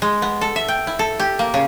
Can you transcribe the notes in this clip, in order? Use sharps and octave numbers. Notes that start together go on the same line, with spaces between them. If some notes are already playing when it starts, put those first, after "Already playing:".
G#3
B3
A4
E5
G5
E4
A4
G4
A#3
C#3